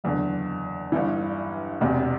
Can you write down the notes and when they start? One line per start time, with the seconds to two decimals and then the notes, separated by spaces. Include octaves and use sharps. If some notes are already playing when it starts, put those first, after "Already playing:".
0.04 F#1 E2 D3
0.92 G1 G2 E3
1.81 E1 E2 C3